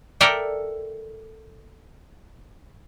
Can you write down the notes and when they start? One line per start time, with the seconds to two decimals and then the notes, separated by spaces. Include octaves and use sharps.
0.21 A4 A#4 D5 E5 G5